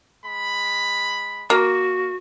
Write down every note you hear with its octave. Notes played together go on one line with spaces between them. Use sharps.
G#3 B5
A#3 F#4